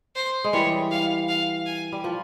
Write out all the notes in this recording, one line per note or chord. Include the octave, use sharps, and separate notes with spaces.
C5
G#3
E3 G3 C#5
F5
F5
G#5
G3
F3